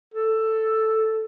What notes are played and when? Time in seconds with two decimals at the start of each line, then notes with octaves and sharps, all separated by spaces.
0.14 A4